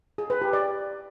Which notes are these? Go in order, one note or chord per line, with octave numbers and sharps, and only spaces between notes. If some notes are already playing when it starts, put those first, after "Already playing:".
G#4
B4
G4
D5